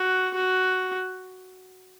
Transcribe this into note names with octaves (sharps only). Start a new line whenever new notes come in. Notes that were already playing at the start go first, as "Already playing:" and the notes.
Already playing: F#4
F#4